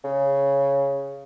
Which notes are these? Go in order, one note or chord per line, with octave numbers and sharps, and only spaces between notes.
C#3